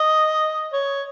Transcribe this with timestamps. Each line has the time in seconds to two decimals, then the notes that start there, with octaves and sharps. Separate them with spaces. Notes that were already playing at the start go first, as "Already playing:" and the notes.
Already playing: D#5
0.73 C#5